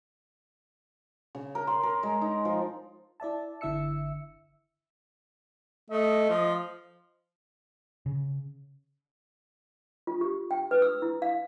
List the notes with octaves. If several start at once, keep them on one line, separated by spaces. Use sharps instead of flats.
C#3
A#4
C6
A#4
G#3
D#4
F3
E4 D5 E5 A5
G1 D3 E4 E5 E6 C#7
A3 D#5
F3
C#3
F4
G4
G5
B4
E6
E4
F5